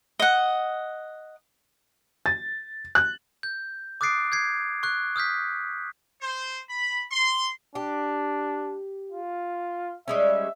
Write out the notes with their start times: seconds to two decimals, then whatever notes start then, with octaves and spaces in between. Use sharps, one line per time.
0.19 D#5 F#5
2.26 A6
2.95 F#6
3.43 G6
4.01 D6 D#6 F#6 A6 C7 D7
4.32 G6 G#6 C7
4.83 C#6 F#6
5.16 D#6 F6 G6 B6
6.21 C5
6.69 B5
7.11 C6
7.75 D4 G4
9.12 F4
10.08 G3 G#3 C#4 E5